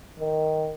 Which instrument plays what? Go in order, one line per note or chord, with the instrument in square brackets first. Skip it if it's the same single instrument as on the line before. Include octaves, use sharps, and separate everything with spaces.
[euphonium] D#3